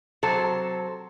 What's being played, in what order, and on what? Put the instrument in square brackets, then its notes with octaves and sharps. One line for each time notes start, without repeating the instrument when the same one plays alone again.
[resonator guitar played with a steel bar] C3 F#3 A4 C5